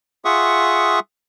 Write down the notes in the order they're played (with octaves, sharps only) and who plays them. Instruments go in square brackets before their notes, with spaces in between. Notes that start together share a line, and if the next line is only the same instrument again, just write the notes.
[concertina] F4 G#4 E5 F#5 C#6 D#6